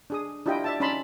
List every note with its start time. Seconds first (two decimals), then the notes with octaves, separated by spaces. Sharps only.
0.10 D4 G#4 D#6
0.46 D4 E4 F4 G4 D#5 G5
0.64 D5 E5 A5
0.80 C#4 D#4 D5 A5 B5 C6